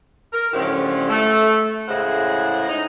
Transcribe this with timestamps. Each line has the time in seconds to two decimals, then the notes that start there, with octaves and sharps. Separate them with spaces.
0.33 A#4
0.53 A2 D3 F3 F#3 C#4 G4
1.09 A3
1.88 A2 C#3 G#3 E4 C5 F#5
2.68 D#4